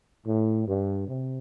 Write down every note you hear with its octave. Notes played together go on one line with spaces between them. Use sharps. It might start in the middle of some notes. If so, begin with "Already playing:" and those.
A2
G2
C3